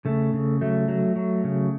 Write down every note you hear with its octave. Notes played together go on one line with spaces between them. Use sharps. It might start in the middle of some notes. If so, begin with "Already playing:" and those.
C#3 A3
C#3
F#3 A3
F#3
F#3
C#3